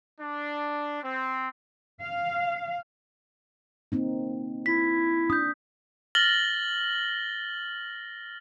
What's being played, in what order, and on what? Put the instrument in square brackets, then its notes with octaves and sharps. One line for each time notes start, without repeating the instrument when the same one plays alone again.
[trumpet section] D4
C4
[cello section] F5
[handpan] A#3 C4 D#4
[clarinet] E4 [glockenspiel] B6
[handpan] D4 [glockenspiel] D#6 G6
[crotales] F6 A6 A#6 F#7 G7